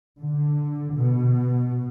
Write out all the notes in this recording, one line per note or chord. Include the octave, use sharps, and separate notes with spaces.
D3
B2